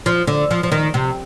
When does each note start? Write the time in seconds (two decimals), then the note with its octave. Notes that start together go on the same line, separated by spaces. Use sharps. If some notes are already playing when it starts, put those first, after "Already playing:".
0.06 F3
0.27 D3
0.51 F3
0.63 F3
0.72 D#3
0.94 C3